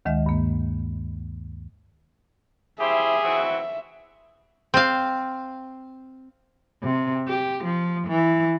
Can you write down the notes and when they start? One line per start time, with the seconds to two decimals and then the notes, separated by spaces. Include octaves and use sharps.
0.05 D2 D#3 G#3 D#5 E5
0.26 G2 A#3
2.80 E4 G4 G#4 C5 E5
3.24 E3 C4 F#4
4.74 C4 F5
6.83 C3
7.28 G4
7.65 F3
8.08 E3